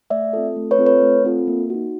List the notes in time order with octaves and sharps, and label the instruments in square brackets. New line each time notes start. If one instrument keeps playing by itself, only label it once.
[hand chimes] A3 D5 E5
C4 F4 A4
A3
B4 C#5
C4 F4 A4
B4 C#5
A3
C4 F4 A4
A#3
D#4 F#4